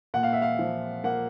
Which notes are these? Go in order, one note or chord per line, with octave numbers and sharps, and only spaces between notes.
A#2 F#5
F5
E5
F5
F3
A#3 F#5